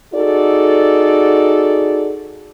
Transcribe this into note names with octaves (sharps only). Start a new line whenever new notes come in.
D#4 F#4 G#4 A4 D5